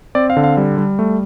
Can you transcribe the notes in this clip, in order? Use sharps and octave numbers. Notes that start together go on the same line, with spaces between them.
C4 D5
F5
D3
F5
G3
G3
A3